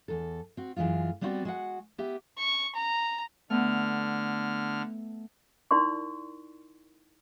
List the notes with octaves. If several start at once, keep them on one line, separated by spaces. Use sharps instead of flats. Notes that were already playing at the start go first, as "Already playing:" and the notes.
E2 A4
C4 F#4
F#2 E3 F#3 G#3 F4
G3 B3 C4 E4 F#4 D5
G#3 F#4 F#5
B3 G4 E5
C#6
A#5
D3 A3 B3 F6
D#4 E4 A#4 D5 C6 C#6